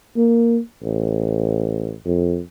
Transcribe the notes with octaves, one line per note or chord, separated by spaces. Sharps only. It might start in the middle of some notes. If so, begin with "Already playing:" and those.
A#3
A1
F2